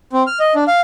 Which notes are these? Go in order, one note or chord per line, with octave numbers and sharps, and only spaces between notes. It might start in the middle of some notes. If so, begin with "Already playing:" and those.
C4
F6
D#5
D4
F5